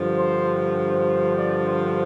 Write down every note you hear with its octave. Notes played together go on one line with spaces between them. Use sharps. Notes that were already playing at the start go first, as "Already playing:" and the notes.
Already playing: G2 D3 F3
C5
C5
D5
C5